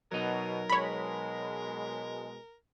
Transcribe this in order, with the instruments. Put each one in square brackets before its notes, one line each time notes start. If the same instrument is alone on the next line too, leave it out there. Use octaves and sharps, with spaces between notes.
[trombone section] B2 [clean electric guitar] F#3 D#4 [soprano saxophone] A#4
[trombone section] B2 G#3 [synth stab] C#5 B5